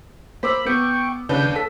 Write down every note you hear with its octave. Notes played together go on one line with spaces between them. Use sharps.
A#3 C5 B5 D6 E6
B3 G5 C#6
D#2 C#3 D4 B4 G6
A4 B6